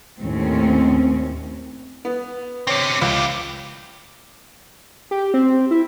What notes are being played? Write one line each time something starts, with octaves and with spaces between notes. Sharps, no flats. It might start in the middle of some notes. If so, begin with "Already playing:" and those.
D#2 A2 C4 C#4
B3
D3 C4 C#5
C#2 E4 G4
G4
C4
E4